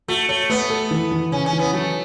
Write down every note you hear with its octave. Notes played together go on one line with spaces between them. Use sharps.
A3 F#4
A3 C#5
A3 B3
A4
E3
E3
C#3 C#4
C#4
E3
B3
F#3 A3